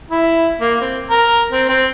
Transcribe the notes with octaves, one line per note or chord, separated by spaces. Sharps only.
E4
A#3
C4
A#4
C4
C4